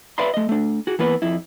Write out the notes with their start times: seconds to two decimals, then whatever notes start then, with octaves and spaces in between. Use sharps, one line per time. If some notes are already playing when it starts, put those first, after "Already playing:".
0.18 B4 D5 E5 F5 B5 C6
0.34 A3 D#5
0.49 A3 D4
0.87 F#4 G#4
0.99 E3 A#3 B3 B4
1.22 F2 E4